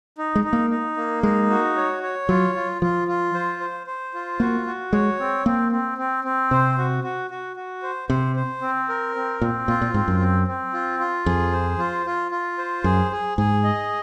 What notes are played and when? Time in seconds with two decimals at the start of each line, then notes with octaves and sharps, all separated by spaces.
0.18 D#4
0.35 G#3
0.44 D#4
0.53 A#3
0.70 D#4
0.97 A#3
1.23 G#3 D#4
1.50 F#4
1.77 C#5
2.03 C#5
2.29 F#3 F4
2.55 F4
2.82 F3 F4
3.08 F4
3.34 C5
3.60 C5
3.87 C5
4.14 F4
4.40 A#3 F#4
4.66 F#4
4.93 G#3 C#5
5.19 C4
5.46 A#3 C4
5.72 C4
5.98 C4
6.24 C4
6.51 C3 C5
6.78 F#4
7.04 F#4
7.30 F#4
7.56 F#4
7.83 C5
8.09 C3 C5
8.36 C5
8.62 C4
8.89 A#4
9.16 C4
9.41 A#2 C4
9.68 A#2 F4
9.82 A#2
9.94 G#2 C4
10.08 F#2
10.20 C4
10.47 C4
10.74 F4
10.99 F4
11.26 F2 G#4
11.52 C5
11.79 F4
12.06 F4
12.31 F4
12.58 C5
12.84 F#2 G#4
13.12 G#4
13.38 G#2 G#4
13.64 D#5